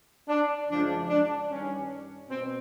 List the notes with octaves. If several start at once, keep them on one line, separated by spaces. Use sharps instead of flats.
D4
F#2 C#3 F3 G#3 D4
D4
G2 D#3 G3 C#4
B2 C4